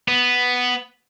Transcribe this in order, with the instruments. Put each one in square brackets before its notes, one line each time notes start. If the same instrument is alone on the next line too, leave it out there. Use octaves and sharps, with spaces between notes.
[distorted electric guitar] B3